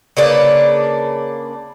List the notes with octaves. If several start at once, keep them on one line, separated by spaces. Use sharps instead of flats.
C#3 A#3 D4 B4